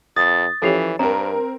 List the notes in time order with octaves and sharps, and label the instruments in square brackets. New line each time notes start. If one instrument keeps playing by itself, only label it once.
[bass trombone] F2 [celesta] D#6 [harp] A6
[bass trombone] E3 [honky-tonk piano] F3 C#4 G4 [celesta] A4 C7 F7
[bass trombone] G2 [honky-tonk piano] C4 A#4 [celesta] A#5